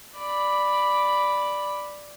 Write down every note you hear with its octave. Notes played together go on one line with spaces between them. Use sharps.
D5 B5